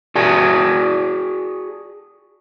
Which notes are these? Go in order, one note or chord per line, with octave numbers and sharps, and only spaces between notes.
F#4 G#4 D5 A5